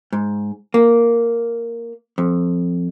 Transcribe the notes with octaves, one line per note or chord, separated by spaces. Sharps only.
G#2
A#3
F2